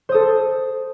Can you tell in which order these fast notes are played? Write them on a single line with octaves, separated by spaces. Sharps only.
C5 D#6 A4